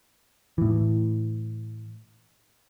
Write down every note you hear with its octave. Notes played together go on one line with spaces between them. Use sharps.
A2 E3